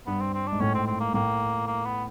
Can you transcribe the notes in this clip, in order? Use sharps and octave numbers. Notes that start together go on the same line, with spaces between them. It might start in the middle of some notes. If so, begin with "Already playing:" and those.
G2 B3
C4
C4
D4
G#2
A2 C#4
C4
C4
A#3
A2 A#3
A#3
B3